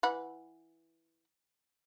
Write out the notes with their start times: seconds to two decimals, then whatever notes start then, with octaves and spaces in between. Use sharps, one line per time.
0.03 E3 F#5 B5